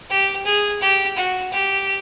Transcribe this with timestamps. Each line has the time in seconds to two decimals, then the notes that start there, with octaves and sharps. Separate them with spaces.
0.10 G4
0.46 G#4
0.81 G4
1.17 F#4
1.52 G4